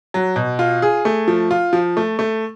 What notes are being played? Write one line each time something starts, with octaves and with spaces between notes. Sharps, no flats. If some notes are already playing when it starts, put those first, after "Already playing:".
F#3
B2
F4
G#4
A3
F3
F4
F3
A3
A3